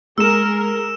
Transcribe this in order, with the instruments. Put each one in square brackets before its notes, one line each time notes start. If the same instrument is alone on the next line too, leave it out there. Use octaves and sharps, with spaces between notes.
[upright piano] G#3 [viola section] G#4 A#4 [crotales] E6 E7